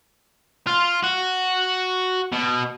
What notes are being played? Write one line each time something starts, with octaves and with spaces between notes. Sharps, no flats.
F4
F#4
B2